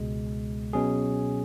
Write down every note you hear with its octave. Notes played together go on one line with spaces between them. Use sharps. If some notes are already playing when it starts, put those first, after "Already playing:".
Already playing: C#2 B2 G#3
B2 F#3 C#4 G#4